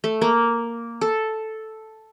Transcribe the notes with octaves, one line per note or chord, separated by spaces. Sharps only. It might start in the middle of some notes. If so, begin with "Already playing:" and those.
A3
A#3
A4